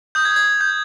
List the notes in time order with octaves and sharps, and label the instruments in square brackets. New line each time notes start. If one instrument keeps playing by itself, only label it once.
[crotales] D#6 G6
G#6
G6
G#6
D#6
G6